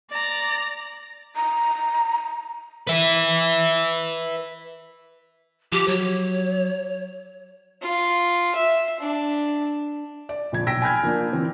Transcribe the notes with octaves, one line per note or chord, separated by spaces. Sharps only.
D5 A#5
A#5
B4 E5
F3 G4
F#3 C#5
F4
E5
D4
D5
A#1 F2 G#6
B1 G5 E6 A#6 B6 D7
G#5 B5 F6 G6 G#6
F3 A#3 D4
E3 C4